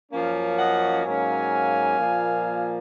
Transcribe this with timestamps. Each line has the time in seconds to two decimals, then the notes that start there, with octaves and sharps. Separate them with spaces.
0.12 F#2 F3 A#3 C#4
0.59 D#5 F#5
1.04 G#2 F#3 A#3 C#4 F5 G#5
1.97 A#2 F3 A#3